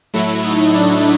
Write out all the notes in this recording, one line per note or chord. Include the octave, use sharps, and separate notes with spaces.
A2 F#3 A3 E4
D#4
D4